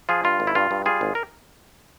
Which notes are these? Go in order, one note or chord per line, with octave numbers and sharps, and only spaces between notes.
F3 F4 G#4
G2 F4
G#1
E4
G2 F4
G2
G3 F4 G#4
G#1
A#4